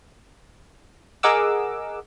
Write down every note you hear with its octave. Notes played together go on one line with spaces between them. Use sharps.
G#4 A#4 D#5 F#5 D6 E6